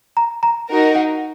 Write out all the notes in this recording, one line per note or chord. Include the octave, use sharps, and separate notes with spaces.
A#5
A#5
D#4 F#4 A#4
F#5